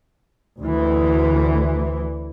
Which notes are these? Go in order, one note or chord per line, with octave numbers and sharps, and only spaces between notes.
D2 E3